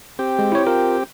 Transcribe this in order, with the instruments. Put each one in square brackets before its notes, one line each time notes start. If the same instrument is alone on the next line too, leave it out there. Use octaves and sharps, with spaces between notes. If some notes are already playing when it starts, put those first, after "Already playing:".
[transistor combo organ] C4 G4
[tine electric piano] G#3
E4 C#5
F4 A#4